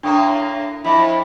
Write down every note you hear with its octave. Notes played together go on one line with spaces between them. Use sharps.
A2 A#3 D4 G5 A#5 C#6 D#6
F2 E4